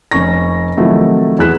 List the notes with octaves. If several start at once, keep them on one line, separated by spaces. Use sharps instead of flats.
F1 C#4 C#6 A#6
C3 D#3 F3 F#3 A3 E4
E2 F#4 G#4 F#6 B6 E7